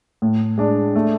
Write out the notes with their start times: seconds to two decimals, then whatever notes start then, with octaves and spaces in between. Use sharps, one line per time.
0.22 A2
0.58 G#3 D4
0.95 A3